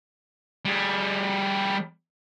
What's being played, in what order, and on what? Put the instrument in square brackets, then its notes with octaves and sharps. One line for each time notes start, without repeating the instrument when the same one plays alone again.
[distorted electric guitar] G3 G#4